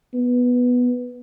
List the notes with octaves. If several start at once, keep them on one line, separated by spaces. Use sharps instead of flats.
B3